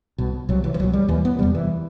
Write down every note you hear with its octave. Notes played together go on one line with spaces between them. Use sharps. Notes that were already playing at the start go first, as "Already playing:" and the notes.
C2 B2
C2 C3 F#3
E3
E3
C2 B2 F#3
G3
D#2 E3
B3
E2 C3 G3
E3